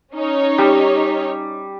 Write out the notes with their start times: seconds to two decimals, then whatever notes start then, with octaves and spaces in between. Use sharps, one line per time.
0.14 C#4 D#4 C#5
0.58 G3